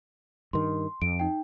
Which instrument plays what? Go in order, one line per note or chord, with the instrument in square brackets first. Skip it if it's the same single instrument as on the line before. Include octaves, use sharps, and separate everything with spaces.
[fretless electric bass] G2 D#3 [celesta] C6
[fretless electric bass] F2 [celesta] D7
[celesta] D#4 G5